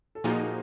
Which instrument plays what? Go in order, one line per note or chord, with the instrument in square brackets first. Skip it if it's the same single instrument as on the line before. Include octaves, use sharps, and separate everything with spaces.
[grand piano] A4
[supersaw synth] A#2 F3 A#3 D#4 [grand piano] F#4 G#4